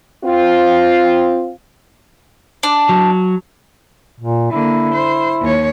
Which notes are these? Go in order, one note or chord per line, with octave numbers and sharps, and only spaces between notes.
C4 F4
D4
F#3
A#2
D3 A#3 E4
C5
D#2 C#5